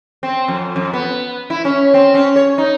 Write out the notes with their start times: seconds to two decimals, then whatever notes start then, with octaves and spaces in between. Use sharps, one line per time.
0.23 C4
0.48 F2
0.76 F2
0.93 B3
1.50 E4
1.65 C#4
1.94 C4
2.14 C#4
2.36 C#5
2.58 D#4